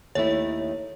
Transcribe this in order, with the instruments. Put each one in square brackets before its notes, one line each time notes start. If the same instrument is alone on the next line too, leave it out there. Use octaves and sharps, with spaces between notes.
[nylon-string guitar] D#2 D#3 A3 E4 [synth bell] C#5